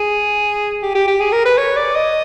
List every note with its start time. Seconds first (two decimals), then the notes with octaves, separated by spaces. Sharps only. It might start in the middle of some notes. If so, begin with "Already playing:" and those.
Already playing: G#4
0.82 G4
0.95 G4
1.08 G4
1.20 G#4
1.33 A#4
1.46 B4
1.58 C#5
1.76 D5
1.95 D#5